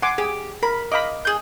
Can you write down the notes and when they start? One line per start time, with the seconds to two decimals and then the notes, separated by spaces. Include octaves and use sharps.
0.02 F#5 G#5 C6 D6
0.18 G4 G#4
0.63 A#4 B5
0.92 D#5 F5 B5 D6
1.25 G#4 G6